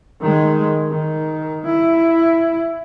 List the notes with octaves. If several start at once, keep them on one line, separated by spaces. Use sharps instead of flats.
D#3 G#3
D#3
E4